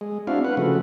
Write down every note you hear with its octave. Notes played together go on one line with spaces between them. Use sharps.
G#3
C4 D4 E4 F#4 F5
B4 F#5
C#3 F3 A3 F#4